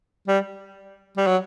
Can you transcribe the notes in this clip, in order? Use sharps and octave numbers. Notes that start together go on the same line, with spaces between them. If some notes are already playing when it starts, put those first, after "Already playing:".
G3
G3
F#3